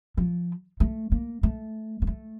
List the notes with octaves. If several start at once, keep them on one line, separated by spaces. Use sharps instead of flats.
F3
A3
A#3
A3
A#3
A3